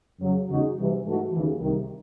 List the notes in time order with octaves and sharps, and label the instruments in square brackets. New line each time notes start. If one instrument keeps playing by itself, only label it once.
[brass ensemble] F#2 C#3 F#3
E2 C#3 G#3 D#4 F#4
C2 C3 E3
G#2 E3 A3 D#4 F#4
D#2 C#3 E3
C2 C3 D#3